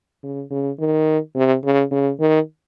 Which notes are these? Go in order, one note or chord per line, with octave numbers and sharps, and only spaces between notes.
C#3
C#3
D#3
C3
C#3
C#3
D#3